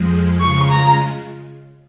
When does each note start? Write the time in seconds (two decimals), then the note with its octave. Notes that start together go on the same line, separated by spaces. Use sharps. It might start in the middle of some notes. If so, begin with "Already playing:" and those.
Already playing: F2 F3 G#3
0.41 C#3 G#3 F4 C#6
0.70 A#5